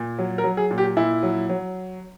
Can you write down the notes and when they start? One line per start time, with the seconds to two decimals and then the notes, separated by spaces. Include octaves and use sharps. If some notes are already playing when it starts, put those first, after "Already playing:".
Already playing: A#2
0.18 F#3
0.38 A#4
0.44 F#3
0.57 G#4
0.71 A#2
0.78 G4
0.97 A#2 E4
1.23 F#3
1.50 F#3